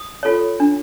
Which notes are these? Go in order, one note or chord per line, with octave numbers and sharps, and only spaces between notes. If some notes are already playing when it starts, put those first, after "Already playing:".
Already playing: D#6
F4 A4 C#5
D4